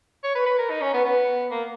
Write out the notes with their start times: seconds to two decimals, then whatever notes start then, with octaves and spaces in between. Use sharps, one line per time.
0.24 C#5
0.35 B4
0.46 B4
0.59 A#4
0.70 D#4
0.81 C#4
0.94 B3
1.05 B3
1.51 A#3